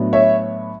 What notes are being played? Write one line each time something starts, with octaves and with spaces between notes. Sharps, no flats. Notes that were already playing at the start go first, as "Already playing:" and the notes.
Already playing: A2 F#3 B3 D4
C#5 E5